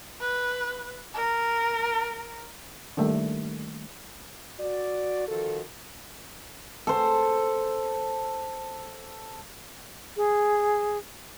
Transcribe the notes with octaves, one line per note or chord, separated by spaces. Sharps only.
B4
A#4
D#3 G3 A3 A#3 D4
F#4 D5
D#3 F3 F#4 A4
A4 C5
G#4